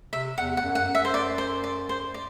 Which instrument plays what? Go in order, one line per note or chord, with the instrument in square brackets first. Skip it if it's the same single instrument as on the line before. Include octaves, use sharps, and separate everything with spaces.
[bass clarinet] C3 [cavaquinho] E5
[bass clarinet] E2 [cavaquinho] F#5
[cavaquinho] F#5
[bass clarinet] F#2
[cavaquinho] F#5
[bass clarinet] F#2
[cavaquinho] E5
C5
D5
C5
D5
C5
D5